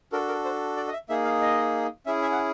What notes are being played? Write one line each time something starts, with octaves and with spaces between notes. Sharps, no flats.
D4 F#4 A4 A#4
A#4
C5
D5
D#5
E5
A#3 D#4 G#4 E5
F5
D#5
C#4 E4 G#4 E5
E5
F#5